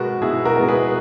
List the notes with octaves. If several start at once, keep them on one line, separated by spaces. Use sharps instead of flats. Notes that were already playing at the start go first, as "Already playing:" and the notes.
Already playing: B2 G#3 B3 F#4 A#4
B2 E4 G#4
F#4 A#4
G#3 B3
G#4 B4